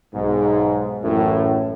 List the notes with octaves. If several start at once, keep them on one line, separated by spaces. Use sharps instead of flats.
B1 G#2
A1 F#2 A2